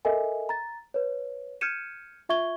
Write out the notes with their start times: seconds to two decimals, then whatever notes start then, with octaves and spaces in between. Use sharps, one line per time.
0.05 A4 A#4 D#5 E5 G#5
0.49 A#5 A6
0.94 B4 C#5
1.61 F6 G6 G#6 C#7 D#7 E7
2.29 F4 E5 C#6 G#6 G7